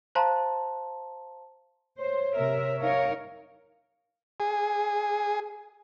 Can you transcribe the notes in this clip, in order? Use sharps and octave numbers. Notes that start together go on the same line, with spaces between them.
C5 F5 A5 A#5 C6
C5 C#5
C3 A#4 E5
D#4 A#4 C#5 F5
G#4